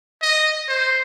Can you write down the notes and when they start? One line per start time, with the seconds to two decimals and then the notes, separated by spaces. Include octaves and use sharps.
0.22 D#5
0.68 C5